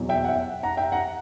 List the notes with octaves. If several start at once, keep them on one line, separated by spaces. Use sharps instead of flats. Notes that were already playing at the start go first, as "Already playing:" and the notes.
Already playing: E2 B2 F#3
E5 G5
F#5
E5 G5
F#5 A#5
E5 G5
F#5 A#5